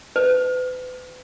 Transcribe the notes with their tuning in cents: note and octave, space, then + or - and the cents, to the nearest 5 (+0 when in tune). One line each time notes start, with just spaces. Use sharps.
B4 +35